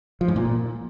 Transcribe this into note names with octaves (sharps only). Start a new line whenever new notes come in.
F3
G#2
A#2